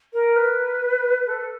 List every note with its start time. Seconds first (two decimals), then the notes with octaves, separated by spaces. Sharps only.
0.13 A#4
0.36 B4
1.27 A4